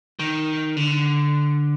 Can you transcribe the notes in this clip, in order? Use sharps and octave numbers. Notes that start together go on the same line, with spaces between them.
D#3
D3